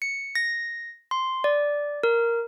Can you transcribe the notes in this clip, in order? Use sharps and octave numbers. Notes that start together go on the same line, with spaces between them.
C#7
A#6
C6
D5
A#4